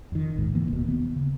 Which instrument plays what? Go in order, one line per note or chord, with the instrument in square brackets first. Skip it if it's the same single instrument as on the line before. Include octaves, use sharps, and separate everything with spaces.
[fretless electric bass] F2 D#3
A#1 F2 G#2
D3 E3 A#3
F1 D#2 B2
B3
C#3